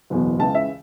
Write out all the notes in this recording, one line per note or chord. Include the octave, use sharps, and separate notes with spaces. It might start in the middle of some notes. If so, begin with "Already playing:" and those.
F#1 E2 B2
C#2 C#3 E3 A5
E5